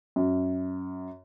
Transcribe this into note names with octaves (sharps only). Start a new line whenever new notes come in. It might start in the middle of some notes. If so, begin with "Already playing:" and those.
F#2